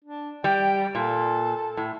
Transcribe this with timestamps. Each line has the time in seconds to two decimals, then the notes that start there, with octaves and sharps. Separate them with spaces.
0.04 D4
0.44 G3 G5
0.95 A#2 A4
1.77 A2